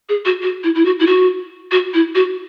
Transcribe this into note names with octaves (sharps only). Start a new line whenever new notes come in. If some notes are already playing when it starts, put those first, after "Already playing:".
G#4
F#4
F#4
E4
E4
F#4
E4
F#4
F#4
E4
F#4